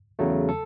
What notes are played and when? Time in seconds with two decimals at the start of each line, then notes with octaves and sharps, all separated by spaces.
0.19 E2 C#3 F#3 A3
0.49 A4